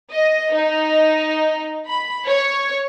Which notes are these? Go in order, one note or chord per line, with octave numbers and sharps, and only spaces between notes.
D#5
D#4
B5
C#5